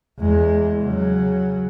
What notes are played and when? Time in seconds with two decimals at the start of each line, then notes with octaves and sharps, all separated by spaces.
0.19 E2 G#3
0.80 C#3 F#3